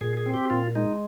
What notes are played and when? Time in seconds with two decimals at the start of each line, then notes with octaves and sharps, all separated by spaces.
0.01 A#2 G#4
0.17 G#4
0.26 C4
0.34 G4
0.50 A#2 F4
0.75 G#3 D#4